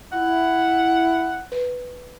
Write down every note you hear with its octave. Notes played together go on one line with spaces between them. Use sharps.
E4 F#5
B4